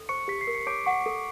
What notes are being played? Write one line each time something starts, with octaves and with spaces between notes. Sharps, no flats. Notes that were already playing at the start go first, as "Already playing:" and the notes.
Already playing: A4
C5 C#6 C#7
G4 B6
C7
A#4
C#7
C#5 D6 D7
F#5 C#6 C#7
A4